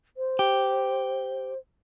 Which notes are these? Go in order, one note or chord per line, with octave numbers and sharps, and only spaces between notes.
C5
G4